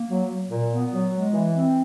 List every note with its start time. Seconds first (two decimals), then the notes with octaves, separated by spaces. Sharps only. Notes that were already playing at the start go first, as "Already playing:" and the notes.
Already playing: A#3
0.09 F#3
0.28 F#3
0.50 A#2
0.71 B3
0.92 F#3
1.13 G#3
1.33 E3
1.54 C4